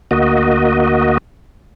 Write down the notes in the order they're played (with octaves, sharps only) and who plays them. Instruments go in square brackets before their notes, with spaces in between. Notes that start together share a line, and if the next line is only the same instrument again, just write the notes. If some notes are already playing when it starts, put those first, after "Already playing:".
[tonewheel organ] D2 A#3 F#4 D#5